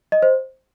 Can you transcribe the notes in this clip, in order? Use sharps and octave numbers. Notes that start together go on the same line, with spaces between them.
D#5
C5